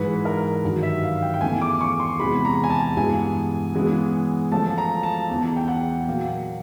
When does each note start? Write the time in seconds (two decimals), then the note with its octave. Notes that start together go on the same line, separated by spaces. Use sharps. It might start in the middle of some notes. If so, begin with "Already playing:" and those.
Already playing: G#2 E3 G#3 B4
0.25 A#4
0.64 G2 D#3 F#3
0.83 E5
1.03 F5
1.22 G5
1.34 G5
1.41 E2 C#3 E3 A3 G#5
1.61 D6
1.81 C#6
2.00 C6
2.19 E2 C3 E3 G#3 B5
2.45 A#5
2.64 G#5
2.70 A5
2.97 G2 E3 G#3 B3 G#5
3.75 C#3 E3 G#3 B3
4.52 C#3 F3 A3 A5
4.78 A#5
5.03 A5
5.30 E2 C#3 E3
5.56 G5
5.68 F#5
6.07 A#2 F#3 A#3